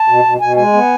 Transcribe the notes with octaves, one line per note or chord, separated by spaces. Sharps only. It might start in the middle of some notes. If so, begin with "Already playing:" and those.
Already playing: A5
B2
B2
B2 G#5
G#3 G#5
B3